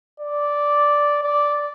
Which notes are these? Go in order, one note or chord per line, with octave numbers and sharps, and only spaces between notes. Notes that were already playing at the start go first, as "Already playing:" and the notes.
D5
D5